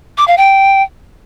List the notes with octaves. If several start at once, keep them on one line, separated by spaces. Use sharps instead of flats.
D6
F5
G5